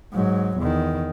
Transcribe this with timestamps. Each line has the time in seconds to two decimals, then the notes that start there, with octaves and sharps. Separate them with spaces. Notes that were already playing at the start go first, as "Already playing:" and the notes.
0.13 G#2 F#3
0.58 E2 D#3